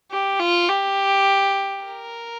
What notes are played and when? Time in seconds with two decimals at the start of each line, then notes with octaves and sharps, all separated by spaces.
0.12 G4
0.39 F4
0.69 G4
1.85 A#4